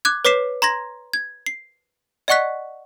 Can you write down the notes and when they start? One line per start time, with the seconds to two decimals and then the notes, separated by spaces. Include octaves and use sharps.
0.05 D6 F#6 G#6
0.25 B4 C#5 D6 B6 C7 E7
0.62 A#5 C6 G#6 A#6
1.13 G#6
1.46 C7
2.28 D5 D#5 F#5 C#6 F#6 B6